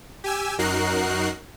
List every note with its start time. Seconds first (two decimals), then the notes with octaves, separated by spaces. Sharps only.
0.24 G4 G#5 E6
0.58 F#2 D#4 F#4 A#4 F#6 C7